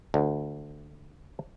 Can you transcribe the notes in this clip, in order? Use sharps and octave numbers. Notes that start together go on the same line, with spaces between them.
D2